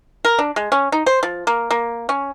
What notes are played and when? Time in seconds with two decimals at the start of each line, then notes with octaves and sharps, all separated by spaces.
0.25 A#4
0.39 D4
0.56 G#3
0.72 C#4
0.92 D#4
1.06 C5
1.23 F3
1.47 A#3
1.71 A#3
2.09 C#4